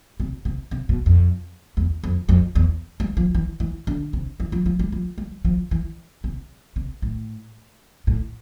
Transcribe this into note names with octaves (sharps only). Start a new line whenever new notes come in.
C3
C3
C3
B2
F2
E2
F2
F2
E2
G3
F3
E3
E3
D3
C3
E3
F3
F3
G3
F3
G3
F3
E3
C3
C3
A2
A2